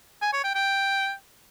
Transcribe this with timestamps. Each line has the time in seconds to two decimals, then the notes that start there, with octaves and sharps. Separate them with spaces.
0.22 G#5
0.33 C#5
0.44 G5
0.55 G5